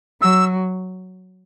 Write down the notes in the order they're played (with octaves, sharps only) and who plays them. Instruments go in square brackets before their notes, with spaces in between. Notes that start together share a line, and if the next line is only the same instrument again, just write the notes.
[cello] F#3 [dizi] E6